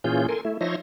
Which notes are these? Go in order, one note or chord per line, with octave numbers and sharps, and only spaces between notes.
A#2 E3 C#4 F4 G#4 G6
A4 A#4 G#5 C6
A3 E4
F3 D#4 C#5 E5 C6 A#6